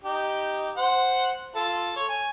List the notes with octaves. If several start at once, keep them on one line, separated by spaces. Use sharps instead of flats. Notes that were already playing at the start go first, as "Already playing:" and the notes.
D#4 G4
C5 F#5
F4 A4
C#5
G#5